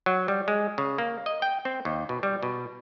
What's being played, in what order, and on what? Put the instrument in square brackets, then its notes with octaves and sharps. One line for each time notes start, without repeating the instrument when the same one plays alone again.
[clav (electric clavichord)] F#3
G3
G#3
C#3
A#3
D#5
G5
C4
D#2
B2
G3
B2